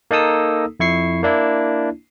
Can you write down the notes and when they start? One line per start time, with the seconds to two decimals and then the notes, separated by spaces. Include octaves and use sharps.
0.11 A#3 D#4 A4 D#6 E6
0.80 F2 E4 C#6 C7
1.23 A#3 D4 E4